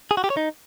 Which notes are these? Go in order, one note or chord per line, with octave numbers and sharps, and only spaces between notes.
G#4
F#4
G4
C#5
D#4